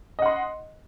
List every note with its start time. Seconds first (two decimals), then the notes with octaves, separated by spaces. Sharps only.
0.19 D#5
0.22 F#5
0.26 C6